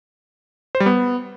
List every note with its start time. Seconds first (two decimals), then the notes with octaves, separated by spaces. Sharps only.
0.75 C5
0.80 G3
0.86 B3